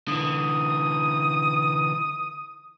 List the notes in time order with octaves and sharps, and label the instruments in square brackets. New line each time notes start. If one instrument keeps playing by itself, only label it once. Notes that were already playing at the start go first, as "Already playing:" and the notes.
[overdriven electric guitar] D3 E3 [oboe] D#6